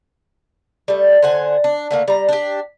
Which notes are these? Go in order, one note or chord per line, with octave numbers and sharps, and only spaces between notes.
G3 A3
D3 C5 F#5 G#5
D4
D3 A3 A#3
G3 A#5
D4 G4